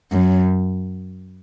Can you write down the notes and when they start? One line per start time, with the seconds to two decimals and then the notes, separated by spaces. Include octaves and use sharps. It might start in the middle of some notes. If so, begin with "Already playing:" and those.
0.12 F#2